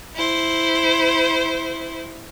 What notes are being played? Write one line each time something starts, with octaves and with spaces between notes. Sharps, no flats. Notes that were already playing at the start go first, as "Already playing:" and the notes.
E4 C5